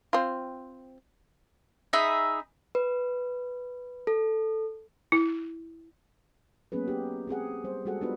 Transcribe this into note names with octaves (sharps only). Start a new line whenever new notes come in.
C4 F4
D#4 G#4 E5 B5
B4
A4
E4
F#3 A#3 B3 C#4 G#4 B4
D#4 G4
C4 G4 G#4 F#5
G3 C5
G3 G#3 F#4 G#4 A4 F#5
B3 D4 D#4 F4 F#4 B4